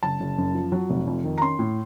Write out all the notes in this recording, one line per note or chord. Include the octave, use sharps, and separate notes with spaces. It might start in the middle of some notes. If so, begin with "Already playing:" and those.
F#1 A5
F#1
F#2
F3
F#3
F1
F2
D#3
A#5
C#4 C6
A2